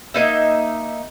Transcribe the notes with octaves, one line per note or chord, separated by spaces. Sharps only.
A#3 D#4 E5